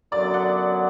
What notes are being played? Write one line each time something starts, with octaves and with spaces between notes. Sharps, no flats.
F#2 D3 F#3 B3 D5
F#5